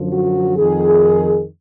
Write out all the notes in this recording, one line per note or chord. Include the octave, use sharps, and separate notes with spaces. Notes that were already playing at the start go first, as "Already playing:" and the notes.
Already playing: F#2 D3 F3
F#4
F2 D#3 G#4